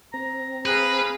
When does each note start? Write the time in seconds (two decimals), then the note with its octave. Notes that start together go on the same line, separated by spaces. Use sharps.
0.14 C4 A#5
0.66 G#4 B4 F5